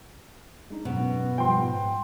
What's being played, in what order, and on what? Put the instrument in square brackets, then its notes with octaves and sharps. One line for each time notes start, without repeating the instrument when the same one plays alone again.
[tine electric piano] G#3 D4 D#4
[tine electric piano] F#2 [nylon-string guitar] B2
[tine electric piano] F3 G3 B3 [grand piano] G5 C6
[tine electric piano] G#2